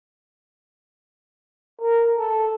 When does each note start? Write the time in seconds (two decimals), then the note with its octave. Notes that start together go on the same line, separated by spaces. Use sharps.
1.81 A#4
2.18 A4